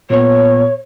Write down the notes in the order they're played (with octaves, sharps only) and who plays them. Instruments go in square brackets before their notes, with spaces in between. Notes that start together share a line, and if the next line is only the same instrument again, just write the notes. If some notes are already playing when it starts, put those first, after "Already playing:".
[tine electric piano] A#2 B3 [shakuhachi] C#5